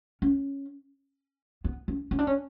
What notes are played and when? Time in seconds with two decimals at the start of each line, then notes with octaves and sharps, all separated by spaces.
0.22 C#4
1.64 B3
1.88 C#4
2.11 C#4
2.19 D4
2.27 C#4